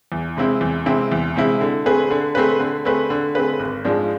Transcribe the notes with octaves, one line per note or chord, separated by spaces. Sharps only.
E2
C3 G#3 C4 E4
E2
C3 G#3 C4 E4
E2
C3 G#3 C4 E4
D3
A3 C4 G#4 B4
D3
A3 C4 G#4 B4
D3
A3 C4 G#4 B4
D3
A3 C4 G#4 B4
G#1
G#2 F3 G#3 D4